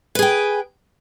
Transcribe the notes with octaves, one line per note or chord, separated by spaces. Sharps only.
G#4 B4 G5